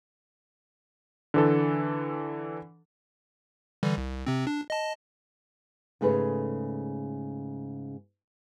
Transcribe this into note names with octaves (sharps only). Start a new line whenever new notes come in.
D3 E3 A4
D3 E3 G3
C2
C3 C4
D4
D#5 A5
G#2 C#3 A3 G#4 B4 C#5